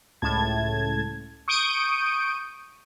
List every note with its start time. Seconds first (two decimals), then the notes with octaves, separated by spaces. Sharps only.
0.22 C#2 A2 A5 G#6
1.48 C#6 D#6 G6 D7 D#7